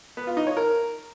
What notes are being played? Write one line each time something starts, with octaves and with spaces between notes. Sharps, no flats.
B3
F4
D#4
C#5
A#4